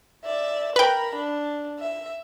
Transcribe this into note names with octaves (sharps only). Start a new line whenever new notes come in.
D5 E5
A#4 B4 G5 B5
D4
E5